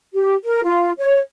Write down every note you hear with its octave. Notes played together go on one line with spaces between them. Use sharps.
G4
A#4
F4
C#5